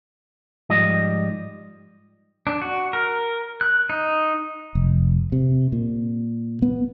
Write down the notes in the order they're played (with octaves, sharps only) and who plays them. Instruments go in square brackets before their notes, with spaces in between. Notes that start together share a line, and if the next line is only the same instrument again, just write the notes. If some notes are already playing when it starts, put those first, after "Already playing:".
[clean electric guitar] G#2 F3 G3 D#5
[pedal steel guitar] D4
F#4
A#4
F#6
D#4
[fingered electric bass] F1
C3
A#2
B3